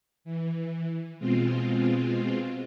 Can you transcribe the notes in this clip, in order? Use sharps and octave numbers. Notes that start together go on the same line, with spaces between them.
E3
B2 G#3 C4 F4